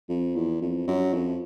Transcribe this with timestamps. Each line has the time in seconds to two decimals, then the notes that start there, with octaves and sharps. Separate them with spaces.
0.09 F2
0.36 E2
0.61 F2
0.87 F#2
1.13 F2